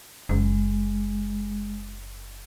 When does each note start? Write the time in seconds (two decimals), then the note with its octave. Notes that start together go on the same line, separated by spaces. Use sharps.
0.29 F#1 G#3